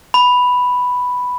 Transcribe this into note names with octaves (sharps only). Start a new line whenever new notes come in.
B5